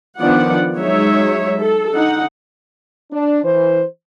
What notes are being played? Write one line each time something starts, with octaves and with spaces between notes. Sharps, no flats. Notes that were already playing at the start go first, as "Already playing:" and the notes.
D#3 F3 B3 D4 D5 F#5
F#3 G#3 D#4 C#5 E5
A4
D3 D#4 F#5
D4
E3 C5